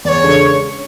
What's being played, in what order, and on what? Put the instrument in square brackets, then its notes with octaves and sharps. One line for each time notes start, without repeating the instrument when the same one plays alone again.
[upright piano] E2 [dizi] D5
[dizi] C#5
[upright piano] C#3 G#3 D4 A4